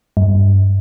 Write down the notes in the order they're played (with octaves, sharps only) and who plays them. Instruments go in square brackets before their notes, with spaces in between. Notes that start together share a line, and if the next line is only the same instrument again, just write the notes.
[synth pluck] G2